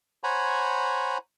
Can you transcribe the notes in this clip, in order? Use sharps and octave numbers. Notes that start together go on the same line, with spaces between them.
C5 C#5 F#5 G#5 A#5 B5